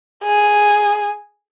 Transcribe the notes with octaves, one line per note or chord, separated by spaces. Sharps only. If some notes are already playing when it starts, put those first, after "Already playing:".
G#4